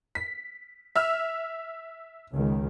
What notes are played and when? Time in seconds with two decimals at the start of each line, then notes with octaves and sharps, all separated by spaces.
0.15 B6
0.96 E5 E6 F6
2.33 C#2 D#3